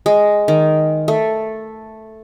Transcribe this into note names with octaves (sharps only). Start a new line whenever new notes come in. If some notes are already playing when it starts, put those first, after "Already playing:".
G#3
D#3
A3